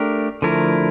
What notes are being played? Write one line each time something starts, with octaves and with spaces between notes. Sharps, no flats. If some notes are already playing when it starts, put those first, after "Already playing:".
Already playing: A3 D4 G4 A#4
D3 F3 A3 E4 A#4